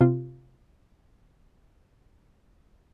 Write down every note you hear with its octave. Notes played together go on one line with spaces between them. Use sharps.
C3 F4